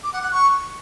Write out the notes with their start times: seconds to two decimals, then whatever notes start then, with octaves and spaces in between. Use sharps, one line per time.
0.04 D6
0.13 F#5
0.22 F#6
0.32 C#6